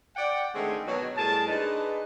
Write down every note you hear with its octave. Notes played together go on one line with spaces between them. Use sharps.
D5 F#5 G5
D3 D#3 G#3 A3 C4 C#4
B2 F#3
A2 G3 G#4 A#4 A5
G#3 D4 D#4 G#4 B4